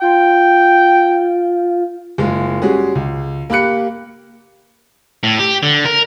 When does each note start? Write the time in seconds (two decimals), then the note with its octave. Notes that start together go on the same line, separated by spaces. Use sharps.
0.02 F4 G5
2.18 F#1 G#3 F4
2.62 G3 G#3 C#4 F#4 G#4
2.95 C#2
3.50 A#3 G4 B5 F#6 C#7
5.23 A2
5.39 G4
5.63 D3
5.85 A#4